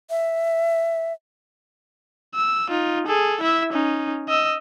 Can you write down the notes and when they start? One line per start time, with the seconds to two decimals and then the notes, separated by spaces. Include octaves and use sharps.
0.10 E5
2.35 E6
2.69 D#4 F4
3.07 G#4 A4
3.41 E4 E5
3.72 C#4 D#4
4.28 D#5 E6